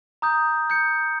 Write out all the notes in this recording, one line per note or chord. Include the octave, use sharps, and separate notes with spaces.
A#5 D#6 G6
G6 C#7